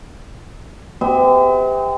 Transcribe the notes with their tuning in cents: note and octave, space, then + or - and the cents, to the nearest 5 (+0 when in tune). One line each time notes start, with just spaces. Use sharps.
C4 -45 G4 +30 E5 -45